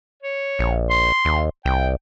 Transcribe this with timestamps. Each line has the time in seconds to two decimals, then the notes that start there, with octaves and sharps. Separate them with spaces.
0.23 C#5
0.59 A#1
0.90 C6
1.25 D#2
1.66 C2 G5